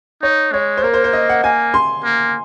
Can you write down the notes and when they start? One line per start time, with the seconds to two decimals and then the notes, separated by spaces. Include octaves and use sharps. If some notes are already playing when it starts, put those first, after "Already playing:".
0.22 D#4 C#5
0.53 G#3 C#5
0.77 C5
0.83 A#3 A#4
0.94 C5
1.04 C5
1.13 D#5
1.29 F#5
1.43 A#3 G#5
1.74 C6
2.04 A#3